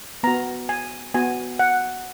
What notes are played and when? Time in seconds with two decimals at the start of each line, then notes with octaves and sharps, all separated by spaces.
0.23 B3 F#4 A#5
0.69 G#5
1.14 B3 F#4 G#5
1.59 F#5